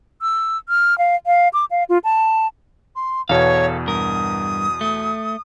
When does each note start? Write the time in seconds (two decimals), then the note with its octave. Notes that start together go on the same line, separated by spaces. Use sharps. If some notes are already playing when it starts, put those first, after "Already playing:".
0.22 E6
0.69 F6
0.98 F5
1.26 F5
1.53 D6
1.71 F5
1.89 F4
2.04 A5
2.95 C6
3.29 E2 B2 A4 C#5 F5
3.88 G2 A#4 D#6
4.81 A3